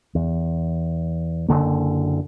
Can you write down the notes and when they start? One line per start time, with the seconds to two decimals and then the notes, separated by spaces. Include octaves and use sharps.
0.15 E2
1.48 F#1 E2 D3 A#3